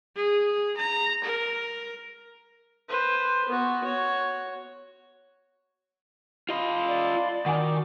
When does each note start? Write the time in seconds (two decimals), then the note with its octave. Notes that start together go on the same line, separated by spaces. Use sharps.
0.16 G#4
0.77 A#5
1.24 A#4
2.89 B4 C5
3.49 B3 F#4
3.84 F#4 C#5
6.49 F4 D#5 F5 B5 C6
6.88 D5
7.46 D#3 F#4 F#5 G#5 D6